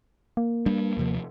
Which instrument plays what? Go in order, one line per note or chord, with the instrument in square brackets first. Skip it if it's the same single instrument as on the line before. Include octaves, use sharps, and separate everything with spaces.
[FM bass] A#3
[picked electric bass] G3 D4
D#2 C3 F3